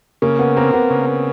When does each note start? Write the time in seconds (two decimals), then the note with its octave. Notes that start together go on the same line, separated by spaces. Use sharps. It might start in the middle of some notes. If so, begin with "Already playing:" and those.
0.22 C#3 A#3
0.39 B3
0.57 A#3 C4
0.74 B3
0.90 C#3